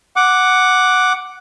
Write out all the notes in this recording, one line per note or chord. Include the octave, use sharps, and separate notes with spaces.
F#5 D6